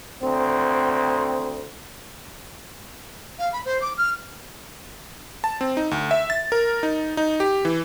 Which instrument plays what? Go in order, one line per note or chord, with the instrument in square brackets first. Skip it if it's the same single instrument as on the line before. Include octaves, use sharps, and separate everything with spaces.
[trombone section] D2 C4
[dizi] F5
B5
C5
D6
F6
[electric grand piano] A5
C4
D#4
D2
E5
A6
A#4
D#4
D#4
G4
E3